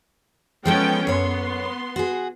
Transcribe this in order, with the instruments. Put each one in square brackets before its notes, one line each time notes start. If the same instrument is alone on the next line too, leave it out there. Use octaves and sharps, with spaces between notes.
[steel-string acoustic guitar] F3 G#3 A4 [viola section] B3 C#4 G5
[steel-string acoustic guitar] F#2 C#5 [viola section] B3 C6
[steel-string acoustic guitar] F#4 G#4